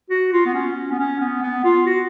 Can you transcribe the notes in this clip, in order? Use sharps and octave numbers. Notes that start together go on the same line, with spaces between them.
F#4
F4
B3
C#4
B3
C#4
B3
B3
F4
F#4